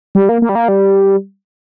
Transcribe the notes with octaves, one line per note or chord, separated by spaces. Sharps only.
G3
A#3
A#3
G3
A#3
G3